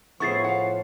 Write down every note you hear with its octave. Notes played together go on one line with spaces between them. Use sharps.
A2 F3 B3 E4 G#4 C#6 A6 C7
F5 F#5